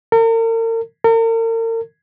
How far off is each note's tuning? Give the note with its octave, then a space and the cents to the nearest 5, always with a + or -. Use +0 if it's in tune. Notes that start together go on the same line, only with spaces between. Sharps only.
A#4 -40
A#4 -40